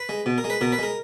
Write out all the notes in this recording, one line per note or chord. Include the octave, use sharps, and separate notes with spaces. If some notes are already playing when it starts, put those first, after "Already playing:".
Already playing: B4
G#3
B2
A#4
G#3
B4
B2 A#4
B4
G#3 A#4